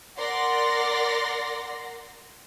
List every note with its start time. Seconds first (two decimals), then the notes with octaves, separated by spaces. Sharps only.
0.18 A#4 D5 F#5 C6 A#6